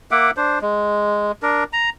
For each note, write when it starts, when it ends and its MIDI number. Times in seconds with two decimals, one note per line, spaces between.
0.11 0.31 58
0.11 0.31 76
0.11 0.31 78
0.11 0.31 86
0.37 0.59 62
0.37 0.59 72
0.61 1.32 56
1.43 1.64 62
1.43 1.64 70
1.73 1.90 82